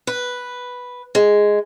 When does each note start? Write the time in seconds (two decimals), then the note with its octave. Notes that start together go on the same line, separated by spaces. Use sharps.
0.07 B4
1.15 G#3